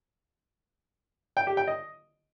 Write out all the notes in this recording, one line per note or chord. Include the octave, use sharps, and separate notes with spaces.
G5
G4
G5
D#5